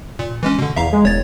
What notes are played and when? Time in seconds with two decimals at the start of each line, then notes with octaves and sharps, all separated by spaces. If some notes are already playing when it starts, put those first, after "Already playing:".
0.19 A#2
0.43 E3 G#3 C#4
0.59 B2 D3
0.76 E2 E5 F5 A#5
0.93 G#3
1.05 E1 C#5 A6